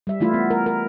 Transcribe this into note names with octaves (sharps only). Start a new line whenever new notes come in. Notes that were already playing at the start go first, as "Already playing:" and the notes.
G3 E5
E3 A3 E4 F4
B3
A#4
A#4